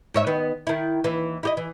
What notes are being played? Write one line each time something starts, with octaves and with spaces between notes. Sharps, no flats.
G#2 C#5 E5
D#3 B3
D#3 E4
D#2 E3
E4 G4 D#5
E3